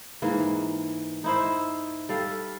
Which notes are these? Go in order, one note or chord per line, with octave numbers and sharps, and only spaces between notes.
G#2 E3 A#3
D#4 E4 C5
G3 A4 F5